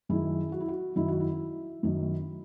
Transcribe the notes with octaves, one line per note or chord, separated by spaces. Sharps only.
F#2 D#3 F#3 E4 G#4
F#4
E4
F#4
F#2 D#3 F#3 E4
F#4
E4
F#2 D#3 F#3